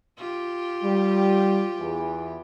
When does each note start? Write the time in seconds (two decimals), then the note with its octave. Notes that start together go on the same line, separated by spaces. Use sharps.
0.17 F4 G4
0.83 G3
1.80 E2 E3